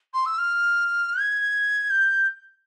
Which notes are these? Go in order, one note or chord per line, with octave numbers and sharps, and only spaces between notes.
C6
E6
F6
G#6
G6